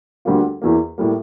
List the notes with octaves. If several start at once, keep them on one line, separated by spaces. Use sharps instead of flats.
D2 D3 G3 A#3 F4
E2 E3 A#3
A2 G3 A#3